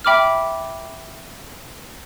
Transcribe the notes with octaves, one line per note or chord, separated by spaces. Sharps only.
E5 G5 B5 D6 F6